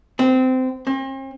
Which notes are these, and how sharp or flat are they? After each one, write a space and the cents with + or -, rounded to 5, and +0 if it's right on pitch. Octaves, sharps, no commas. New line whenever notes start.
C4 -20
C4 +45